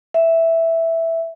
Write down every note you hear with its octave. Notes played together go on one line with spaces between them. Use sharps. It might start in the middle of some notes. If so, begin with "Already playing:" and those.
E5